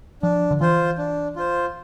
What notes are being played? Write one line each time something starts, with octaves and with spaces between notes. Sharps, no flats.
F3 D4
D3
E3 F4 C5
D4
F4 C5